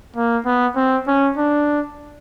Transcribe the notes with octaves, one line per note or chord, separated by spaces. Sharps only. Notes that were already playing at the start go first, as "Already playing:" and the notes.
A#3
B3
C4
C#4
D4